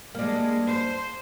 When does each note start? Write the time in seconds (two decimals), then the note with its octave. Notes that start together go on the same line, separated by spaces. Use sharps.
0.15 G3 G#3 A#3 D4
0.67 C5